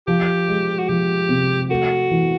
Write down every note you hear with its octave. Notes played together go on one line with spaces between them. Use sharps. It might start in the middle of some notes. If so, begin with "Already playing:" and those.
F3 G4
G#3
F#4
F3 G4
C3
A3 F#4
E3